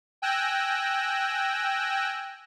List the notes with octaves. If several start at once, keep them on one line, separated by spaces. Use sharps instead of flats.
G5 G#5 E6 F#6 A#6